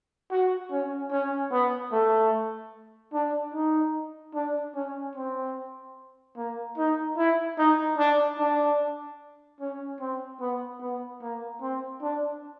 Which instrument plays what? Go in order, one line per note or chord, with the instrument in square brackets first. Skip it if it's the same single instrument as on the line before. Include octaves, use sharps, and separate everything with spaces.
[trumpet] F#4
C#4
C#4
B3
A3
D4
D#4
D4
C#4
C4
A#3
D#4
E4
D#4
D4
D4
C#4
C4
B3
B3
A#3
C4
D4